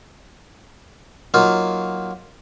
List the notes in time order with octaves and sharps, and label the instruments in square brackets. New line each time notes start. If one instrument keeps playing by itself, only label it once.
[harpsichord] F#3 A#3 D#4 F4